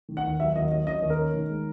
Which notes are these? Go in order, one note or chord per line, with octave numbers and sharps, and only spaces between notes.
D#3
F#5
D#2
F#3 E5
D#2 D#5
F#3 D#5
C#4 D#5
D#2
A#4
C#4
D#3
G#3